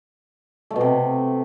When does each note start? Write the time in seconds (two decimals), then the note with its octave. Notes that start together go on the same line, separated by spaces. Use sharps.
0.71 A3
0.76 B2
0.81 C3